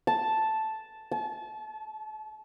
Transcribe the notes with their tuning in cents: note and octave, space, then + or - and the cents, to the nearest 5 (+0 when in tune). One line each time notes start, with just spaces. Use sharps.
A5 -5
A5 -35